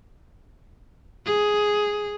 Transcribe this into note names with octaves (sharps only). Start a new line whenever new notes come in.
G#4